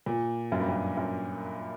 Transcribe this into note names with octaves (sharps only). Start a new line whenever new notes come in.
A#2
F#2
G2
F#2
F#2